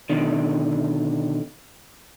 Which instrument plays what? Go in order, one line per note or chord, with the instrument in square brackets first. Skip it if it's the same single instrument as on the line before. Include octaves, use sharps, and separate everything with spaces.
[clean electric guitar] B2 D3 D#3